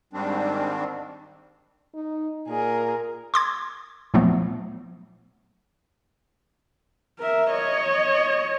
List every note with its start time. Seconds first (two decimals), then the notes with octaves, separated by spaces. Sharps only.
0.13 G#2 D#3 G3 C4 D4
1.95 D#4
2.48 A#2 G#4 A#4
3.34 C6 D6 G#6
4.14 A#2 F3 F#3 A3 B3
7.19 A#4 E5
7.51 C#5 D#5